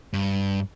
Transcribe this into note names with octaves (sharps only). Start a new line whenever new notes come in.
G2